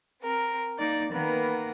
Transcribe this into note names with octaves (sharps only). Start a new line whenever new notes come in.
C4 A#4
A#3 D#4 D5
D#3 A#3 B3 A#4 B4